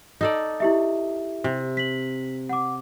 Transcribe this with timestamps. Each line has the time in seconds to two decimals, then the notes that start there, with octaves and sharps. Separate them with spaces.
0.21 D#4 A4 D5
0.60 E4 G4 E5
1.44 C3
1.77 B6 F#7
2.49 F#5 D6